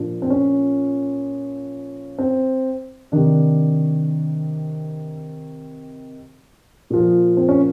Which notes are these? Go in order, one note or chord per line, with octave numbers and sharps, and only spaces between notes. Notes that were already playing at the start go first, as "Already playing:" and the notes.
Already playing: A#2 F3 D4
C4
C#4
C4
C3 D#3 D4
A#2 F3
C4
C#4